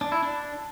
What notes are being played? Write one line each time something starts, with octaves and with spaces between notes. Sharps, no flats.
D4
E4
D4